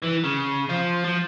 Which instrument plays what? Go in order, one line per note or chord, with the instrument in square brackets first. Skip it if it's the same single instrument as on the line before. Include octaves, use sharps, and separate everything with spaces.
[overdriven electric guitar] E3
C#3
F3 F4
F3